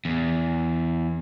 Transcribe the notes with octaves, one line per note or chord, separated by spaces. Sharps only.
E2